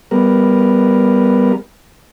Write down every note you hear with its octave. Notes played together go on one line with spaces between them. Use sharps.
G3 B3 A#4